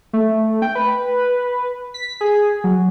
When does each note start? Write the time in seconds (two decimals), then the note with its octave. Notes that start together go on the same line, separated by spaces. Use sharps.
0.13 A3
0.62 G5
0.75 B4
1.94 B6
2.21 G#4
2.64 F#3